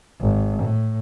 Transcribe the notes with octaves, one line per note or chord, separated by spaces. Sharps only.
G#1
A2